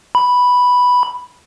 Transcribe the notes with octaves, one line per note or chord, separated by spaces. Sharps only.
B5